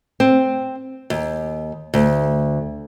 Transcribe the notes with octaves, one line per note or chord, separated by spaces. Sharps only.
C4
D#2
D2